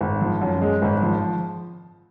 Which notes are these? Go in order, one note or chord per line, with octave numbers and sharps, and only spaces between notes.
G#1
F3
F#2
G#3
G#1
F3